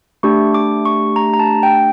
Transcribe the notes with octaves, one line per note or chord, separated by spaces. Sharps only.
A3 D4 G4 C#6
D6
C#6
A#5
A#5
A5
G5